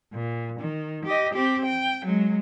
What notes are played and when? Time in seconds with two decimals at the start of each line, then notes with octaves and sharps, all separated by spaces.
0.13 A#2
0.59 D#3
1.05 G4 D#5
1.33 C4 G4
1.65 G5
2.05 F#3 G#3